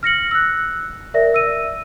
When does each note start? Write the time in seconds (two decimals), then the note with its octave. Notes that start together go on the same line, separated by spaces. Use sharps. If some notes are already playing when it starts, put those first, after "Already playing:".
0.03 F6 A#6 C#7 F#7
0.31 E6 F#6
1.14 A#4 D5 E5 A#6
1.34 E6 D#7